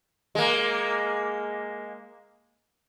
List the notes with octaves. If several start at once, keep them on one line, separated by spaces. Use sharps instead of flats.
G#3 A#3